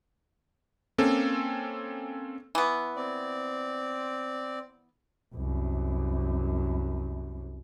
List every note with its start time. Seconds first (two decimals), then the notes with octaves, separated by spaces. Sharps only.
0.98 A#3 C4 C#4 A4
2.55 E3 B3
2.96 C4 D5
5.35 C2 F#2